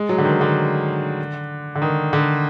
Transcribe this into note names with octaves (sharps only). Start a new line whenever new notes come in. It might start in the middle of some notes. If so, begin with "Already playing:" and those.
Already playing: G#3
F#3
D3
D#3
D3
D3
D#3
D3